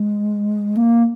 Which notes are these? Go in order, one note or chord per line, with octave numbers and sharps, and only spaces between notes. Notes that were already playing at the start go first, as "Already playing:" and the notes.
Already playing: G#3
A#3